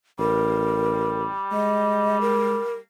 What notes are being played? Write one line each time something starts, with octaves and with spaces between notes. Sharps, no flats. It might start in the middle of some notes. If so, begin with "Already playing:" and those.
A1 G3 A#4
G#3 D#5
A#4